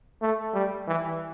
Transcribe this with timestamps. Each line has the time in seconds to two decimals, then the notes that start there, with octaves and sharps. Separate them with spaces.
0.22 A3
0.54 G3
0.88 E3